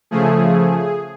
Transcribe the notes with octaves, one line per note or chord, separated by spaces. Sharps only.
C#3 F3 A3 G#4